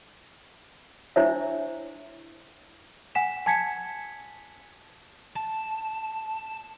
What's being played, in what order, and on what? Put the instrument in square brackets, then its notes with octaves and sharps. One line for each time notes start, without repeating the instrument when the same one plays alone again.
[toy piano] D4 E4 C5 C#5 E5
[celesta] F#5 G#5 B6 E7
G#5 A5 G#6 B6 C#7
[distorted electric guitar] A5